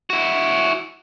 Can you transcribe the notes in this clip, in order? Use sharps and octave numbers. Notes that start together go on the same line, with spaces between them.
E4 F#4